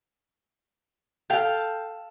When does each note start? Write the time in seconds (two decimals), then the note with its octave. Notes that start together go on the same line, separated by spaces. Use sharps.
1.30 A4 F5 G5